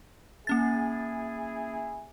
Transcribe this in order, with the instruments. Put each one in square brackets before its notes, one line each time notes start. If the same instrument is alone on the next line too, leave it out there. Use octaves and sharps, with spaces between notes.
[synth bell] A#3 C#4 A6 [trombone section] E4 G#4